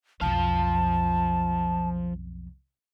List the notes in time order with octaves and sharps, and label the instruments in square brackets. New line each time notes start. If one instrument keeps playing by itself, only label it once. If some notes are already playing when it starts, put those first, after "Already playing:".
[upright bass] B1 F2 [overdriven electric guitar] F3 F5 [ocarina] A5